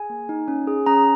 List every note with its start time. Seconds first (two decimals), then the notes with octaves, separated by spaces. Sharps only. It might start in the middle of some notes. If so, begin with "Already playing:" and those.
Already playing: G#4 G#5
0.10 A#3
0.29 D#4
0.48 C#4
0.67 G#4
0.86 C#4 A#5